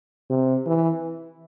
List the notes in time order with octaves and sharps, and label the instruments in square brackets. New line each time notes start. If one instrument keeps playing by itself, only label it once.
[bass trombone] C3
E3